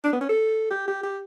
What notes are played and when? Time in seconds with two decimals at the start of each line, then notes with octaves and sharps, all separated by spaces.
0.04 D4
0.13 B3
0.21 C#4
0.29 A4
0.70 G4
0.87 G4
1.03 G4